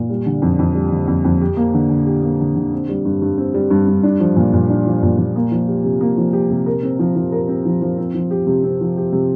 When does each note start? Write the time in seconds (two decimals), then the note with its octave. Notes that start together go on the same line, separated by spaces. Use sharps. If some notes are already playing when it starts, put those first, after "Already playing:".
Already playing: A#2
0.10 G3
0.26 D3
0.42 F2
0.59 F2
0.75 G3
0.92 D3
1.07 F2
1.25 F2
1.41 G4
1.57 A#3
1.74 D3
1.90 D3
2.06 G4
2.22 A#3
2.40 D3
2.55 D3
2.72 C4
2.89 G3
3.05 G2
3.22 G2
3.38 C4
3.54 G3
3.70 G2
3.87 G2
4.03 D4
4.20 F3
4.36 A#2
4.53 A#2
4.70 D4
4.86 F3
5.03 A#2
5.18 A#2
5.36 A#3
5.51 F3
5.67 G4
5.84 C3
6.01 A#3
6.17 F3
6.33 G4
6.50 C3
6.66 A#4
6.83 C4
6.99 F3
7.15 F3
7.32 A#4
7.49 C4
7.65 F3
7.82 F3
7.98 C4
8.14 F3
8.31 G4
8.47 C3
8.63 C4
8.80 F3
8.97 G4
9.12 C3